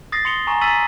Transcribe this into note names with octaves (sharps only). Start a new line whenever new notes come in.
D#6 A6 A#6 C7
C6 C#7 F7 G7
G#5 A#5 C#6
A#5 E6 A6 B6 D#7 F#7